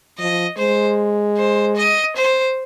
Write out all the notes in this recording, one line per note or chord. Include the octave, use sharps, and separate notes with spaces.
F3 D#5
G#3 C5
C5
D#5
C5